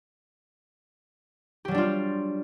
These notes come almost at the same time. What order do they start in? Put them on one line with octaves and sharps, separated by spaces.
G4 F#3 G3 D4 F4